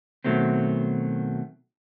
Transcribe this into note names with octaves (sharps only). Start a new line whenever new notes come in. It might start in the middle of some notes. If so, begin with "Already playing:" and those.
B2 D#3 F#3 A3 C4